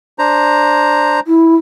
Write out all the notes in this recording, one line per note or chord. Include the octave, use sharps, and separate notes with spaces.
D4 C5 A#5
E4